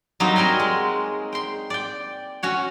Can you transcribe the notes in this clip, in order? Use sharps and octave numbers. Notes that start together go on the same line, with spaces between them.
F#3 G3 A#3 C4 D#4 F#4
C4 A#4 C#5 G#5
G#3
G5 C6
D5 G5
C#4 F#4 C#5